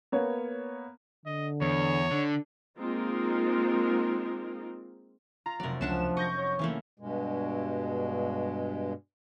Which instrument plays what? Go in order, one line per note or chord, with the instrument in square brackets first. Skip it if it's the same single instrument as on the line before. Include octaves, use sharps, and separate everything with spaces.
[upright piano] A#3 B3 C#5
[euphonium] D3 [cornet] D#5
[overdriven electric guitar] E2 [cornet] C#5
[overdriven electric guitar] D3 [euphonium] D4
[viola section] G#3 A#3 C4 D#4 F4 A#4
[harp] F4 [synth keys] A#5
[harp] F1 F#3 [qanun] A#4 D5
[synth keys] C#2 E7 [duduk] F3 [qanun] C#4 D4 F#5
[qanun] D#5 [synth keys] C#6 G6 A#6
[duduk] C#5
[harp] E3 E4 [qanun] A3 A#3 C#4
[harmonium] G2 B2 G#3